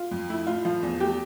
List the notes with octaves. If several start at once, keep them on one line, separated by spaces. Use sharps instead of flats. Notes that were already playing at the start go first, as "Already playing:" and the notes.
Already playing: F4
F2
A3 E4
A2 F4
F3 F4
E2
A3 G4